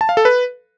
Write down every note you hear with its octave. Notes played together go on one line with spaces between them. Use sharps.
A5
F5
A4
B4